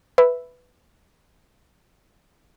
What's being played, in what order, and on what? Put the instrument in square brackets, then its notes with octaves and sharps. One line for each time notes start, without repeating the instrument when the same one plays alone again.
[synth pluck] B4 E5